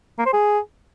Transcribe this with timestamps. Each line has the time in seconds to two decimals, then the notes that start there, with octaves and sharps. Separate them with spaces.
0.18 A#3
0.26 C5
0.33 G#4